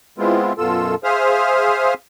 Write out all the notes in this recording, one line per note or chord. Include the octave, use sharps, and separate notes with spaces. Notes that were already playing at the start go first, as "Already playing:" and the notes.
G#3 B3 C4 E4 F4
F#2 B2 F4 A4 E6
G#4 C5 E5 F5 D#6 F6